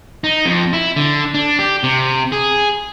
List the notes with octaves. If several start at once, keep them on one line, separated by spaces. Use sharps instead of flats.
D#4
F2
E4
D3
D4
G4
C3
G#4